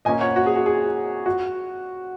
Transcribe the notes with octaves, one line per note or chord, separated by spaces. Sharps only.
A#2 A#3 C#4 D#5 G#5
C#5 F#5
F#4
G#4
F#4
G#4
F#4